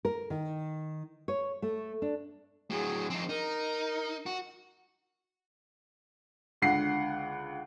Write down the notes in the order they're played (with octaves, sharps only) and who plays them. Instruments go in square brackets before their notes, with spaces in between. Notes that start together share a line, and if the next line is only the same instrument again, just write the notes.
[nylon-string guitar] A#4
D#3
C#5
A3
D4
[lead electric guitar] A2 F#3 [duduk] G#4
[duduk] F3 [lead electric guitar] C4 D#4
[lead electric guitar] D#4 [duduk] A#4
[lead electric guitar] F#4
[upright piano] C#2 D3 F#5 C7